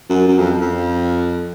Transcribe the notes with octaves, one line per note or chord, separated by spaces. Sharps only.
F#2
F#2
F2
F2